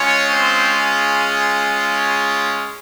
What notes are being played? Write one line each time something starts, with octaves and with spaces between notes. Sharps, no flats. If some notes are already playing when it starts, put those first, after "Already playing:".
Already playing: G#3 C#4 F4 C#5
C4 C5
G#4